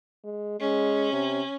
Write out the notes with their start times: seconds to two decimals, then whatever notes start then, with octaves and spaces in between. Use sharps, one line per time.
0.24 G#3
0.60 G#3 C#4
1.13 C3